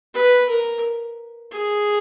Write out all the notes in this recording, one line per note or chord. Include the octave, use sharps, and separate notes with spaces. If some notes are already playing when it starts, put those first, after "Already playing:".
B4
A#4
G#4